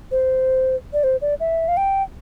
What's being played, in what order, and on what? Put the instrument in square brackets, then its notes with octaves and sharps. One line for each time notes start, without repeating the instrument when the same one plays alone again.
[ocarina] C5
D5
C5
D5
E5
F5
G5